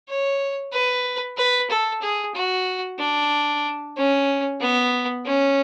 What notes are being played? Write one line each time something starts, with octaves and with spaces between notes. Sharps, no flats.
C#5
B4
B4
A4
G#4
F#4
D4
C#4
B3
C#4